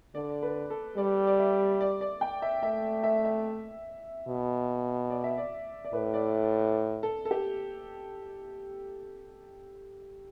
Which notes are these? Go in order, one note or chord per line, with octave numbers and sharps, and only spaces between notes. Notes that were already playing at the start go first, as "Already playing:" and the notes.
D3 D5
B4
A4
G3 D5
D5
E5
D5
D5
G5
E5
A3 E5
E5
E5
B2
D5
E5
D5
D5
A2 B4
D5
A4
A4
G4